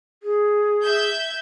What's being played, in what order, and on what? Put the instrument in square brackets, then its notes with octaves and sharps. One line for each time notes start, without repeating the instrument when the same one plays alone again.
[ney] G#4
[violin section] E5 G6 G#6